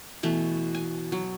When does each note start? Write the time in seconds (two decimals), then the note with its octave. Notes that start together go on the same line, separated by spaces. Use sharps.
0.23 B2 E3 A3
0.75 G#5
1.12 F#3